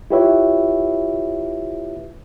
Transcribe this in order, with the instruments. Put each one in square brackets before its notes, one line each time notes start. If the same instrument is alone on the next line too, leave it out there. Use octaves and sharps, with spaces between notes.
[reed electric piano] E4 F4 G4 B4 C#5 E5